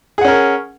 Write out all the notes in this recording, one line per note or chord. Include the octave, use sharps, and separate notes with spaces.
C#4 G#4 A#4 F#5